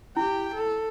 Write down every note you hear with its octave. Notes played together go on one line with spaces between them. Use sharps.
E4 G4 G5
A4